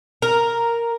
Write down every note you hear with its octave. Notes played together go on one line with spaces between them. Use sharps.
A#4